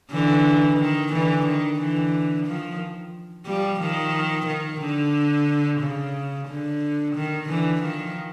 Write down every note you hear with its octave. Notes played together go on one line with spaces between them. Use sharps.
D3 E3
D#3
D3 E3
D#3
D3 E3
D#3 F3
F3 G3
D#3 F3
D#3
D3
C#3
D3
D#3
D3 E3
D#3 F3